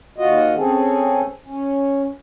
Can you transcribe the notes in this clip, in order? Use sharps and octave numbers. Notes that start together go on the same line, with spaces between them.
D#2 F4 F#4 D#5
C4 C#4 G#4 A4
C#4